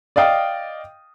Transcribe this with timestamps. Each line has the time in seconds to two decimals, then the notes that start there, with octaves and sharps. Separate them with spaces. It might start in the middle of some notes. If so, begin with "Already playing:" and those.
0.16 D5 D#5 F5 G5 D#6